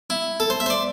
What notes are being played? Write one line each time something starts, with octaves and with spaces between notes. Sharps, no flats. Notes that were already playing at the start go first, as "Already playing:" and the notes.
E4
A4
C5
E5
C5
D5